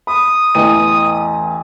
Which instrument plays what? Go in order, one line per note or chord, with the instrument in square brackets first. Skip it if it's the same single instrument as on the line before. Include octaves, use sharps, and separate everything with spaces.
[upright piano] B5 [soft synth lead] D#6
[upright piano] A1 E2 D#7